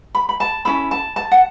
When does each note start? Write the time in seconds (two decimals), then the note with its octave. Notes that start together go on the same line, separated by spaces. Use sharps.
0.15 B5
0.29 B5
0.40 A5
0.65 C#4 E4 A4 B5
0.91 A5
1.16 A5
1.32 F#5